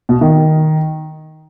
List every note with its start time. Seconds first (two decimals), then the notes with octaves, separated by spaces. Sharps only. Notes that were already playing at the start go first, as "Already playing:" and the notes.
0.09 B2
0.21 D#3